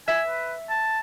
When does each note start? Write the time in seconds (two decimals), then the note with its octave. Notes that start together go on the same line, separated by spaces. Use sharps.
0.08 E5 G#5
0.27 B4
0.70 A5